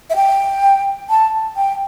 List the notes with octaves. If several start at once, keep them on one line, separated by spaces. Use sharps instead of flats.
E5
G5
A5
G5